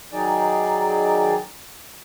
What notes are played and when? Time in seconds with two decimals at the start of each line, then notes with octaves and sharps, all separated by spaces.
0.12 D#3 F#3 D#4 G#4 D5